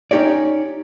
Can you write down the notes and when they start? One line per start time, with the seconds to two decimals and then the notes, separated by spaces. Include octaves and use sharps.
0.11 C#4 D#4 G4 C#5 D5